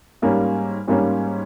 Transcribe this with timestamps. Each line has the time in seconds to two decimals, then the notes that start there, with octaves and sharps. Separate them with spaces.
0.22 G#2 G3 A#3 C#4
0.88 G#2 G3 A#3 C#4